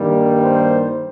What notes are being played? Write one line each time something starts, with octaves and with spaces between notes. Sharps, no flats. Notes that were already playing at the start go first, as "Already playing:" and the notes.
Already playing: G2 D#3 G3 A#3
C5